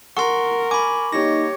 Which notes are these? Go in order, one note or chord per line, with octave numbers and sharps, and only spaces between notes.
A#4 F#5 C6 C#6
G#5 B5 D6
A#3 D#4 G4 C#5 A#6